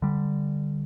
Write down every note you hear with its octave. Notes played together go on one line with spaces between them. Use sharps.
D3 G3